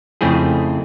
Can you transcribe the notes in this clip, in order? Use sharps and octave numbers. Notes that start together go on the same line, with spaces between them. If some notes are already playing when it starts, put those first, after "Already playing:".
F2 C#3 A3 C4 E4 G#4